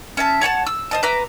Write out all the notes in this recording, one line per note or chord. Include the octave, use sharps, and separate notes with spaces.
C#4 E5 A5
C#5 F#5 G#5 A5
E6
C5 D#5 A5
B4 E5 A#5 D6